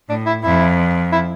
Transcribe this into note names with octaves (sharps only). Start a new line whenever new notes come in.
A2 D4
E4
F2 E4
E4